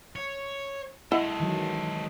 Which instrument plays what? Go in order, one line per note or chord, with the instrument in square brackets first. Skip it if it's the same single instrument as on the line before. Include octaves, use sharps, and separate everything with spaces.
[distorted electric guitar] C#5
[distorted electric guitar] G#3 A4 [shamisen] E4 D#5 F#5
[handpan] D#3 E3 F#3